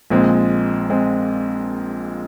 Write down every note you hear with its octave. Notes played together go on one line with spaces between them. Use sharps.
A#1 A#2 G#3 C4
G#3 C4